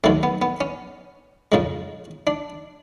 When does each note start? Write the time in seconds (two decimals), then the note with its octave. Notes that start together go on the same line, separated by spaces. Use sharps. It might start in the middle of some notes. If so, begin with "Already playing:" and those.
0.04 D#2 D#3 F#3 A3 C4
0.23 B3
0.42 B3
0.61 C#4
1.52 F2 C#3 F3 G#3
2.27 D4